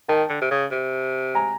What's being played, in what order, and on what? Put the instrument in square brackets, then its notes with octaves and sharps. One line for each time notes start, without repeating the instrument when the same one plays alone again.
[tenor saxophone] D#3 [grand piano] G5 A5
[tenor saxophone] D3
C3
C#3
C3
[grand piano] G#5 A#5